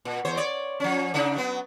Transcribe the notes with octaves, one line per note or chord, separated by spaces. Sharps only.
A#2
E2 C5 C#5
C#5 D5
F3 C#4
C#3 D4 D#4
F#3 B3